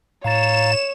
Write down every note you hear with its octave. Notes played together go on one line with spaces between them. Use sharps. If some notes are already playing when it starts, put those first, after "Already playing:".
A2 C#5 F5 A#5 A6 E7